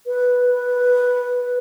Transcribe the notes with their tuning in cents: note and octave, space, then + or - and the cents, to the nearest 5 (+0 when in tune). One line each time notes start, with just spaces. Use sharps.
B4 -5